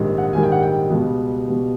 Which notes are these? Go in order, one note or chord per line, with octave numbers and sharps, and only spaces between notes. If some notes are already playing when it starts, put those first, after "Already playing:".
Already playing: A#1 G#2 D#3 G3
F#5
A#1 G#2 D#3 G3 G#5
G5
F#5
G5
C#2 B2 G3 B3
C#2 B2 G3 B3